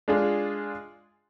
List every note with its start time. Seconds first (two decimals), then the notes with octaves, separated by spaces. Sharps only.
0.08 G#3 D4 F4 G#4